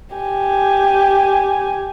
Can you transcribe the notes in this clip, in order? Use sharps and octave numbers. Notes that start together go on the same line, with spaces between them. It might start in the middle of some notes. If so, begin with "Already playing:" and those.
G4 G#5